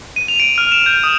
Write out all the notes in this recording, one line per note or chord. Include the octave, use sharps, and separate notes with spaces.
D#7
F7
D7
F6
E7
G6
D#6